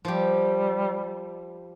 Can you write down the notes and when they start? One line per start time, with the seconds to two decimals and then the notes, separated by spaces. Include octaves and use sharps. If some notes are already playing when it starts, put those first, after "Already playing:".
0.05 F3 G3 G4